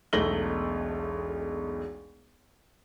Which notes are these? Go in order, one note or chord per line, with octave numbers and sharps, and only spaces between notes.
E1 B1 A3 A#6 F#7 G7